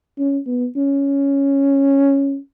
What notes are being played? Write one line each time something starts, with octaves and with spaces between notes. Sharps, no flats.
C#4
B3
C#4